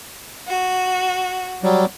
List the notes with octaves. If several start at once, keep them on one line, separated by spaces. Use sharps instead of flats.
F#4
F#3 G3